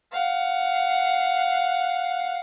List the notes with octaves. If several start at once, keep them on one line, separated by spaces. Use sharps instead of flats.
F5 F#5